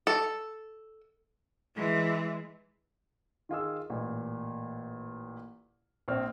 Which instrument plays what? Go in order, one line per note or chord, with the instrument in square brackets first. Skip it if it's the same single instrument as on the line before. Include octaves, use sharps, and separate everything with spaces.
[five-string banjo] A4
[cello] E3 G#3
[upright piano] D#3 F4 G#4 E6
A1 A#2
A#1 C4 F6